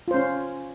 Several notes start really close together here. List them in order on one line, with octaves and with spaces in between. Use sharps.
F4 C5 C#4